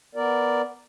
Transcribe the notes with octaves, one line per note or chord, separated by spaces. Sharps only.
B3 A#4 D5